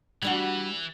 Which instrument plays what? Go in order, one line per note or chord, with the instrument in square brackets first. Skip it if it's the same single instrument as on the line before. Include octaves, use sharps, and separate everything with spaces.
[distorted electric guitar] E3 [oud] G3 D4 F#4